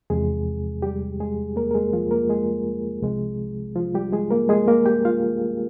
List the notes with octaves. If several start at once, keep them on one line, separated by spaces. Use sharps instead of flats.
E2 C3 F3 G#3 G#4
G3 G4
G#3 G#4
A#3 A#4
A#4
G#3 G#4
F3 F4
A#3 A#4
G#3 G#4
C2 C3 F3 G#3
F3 F4
G3 G4
G#3 G#4
A#3 A#4
G#3 G#4
A#3 A#4
G4 G5
F4 F5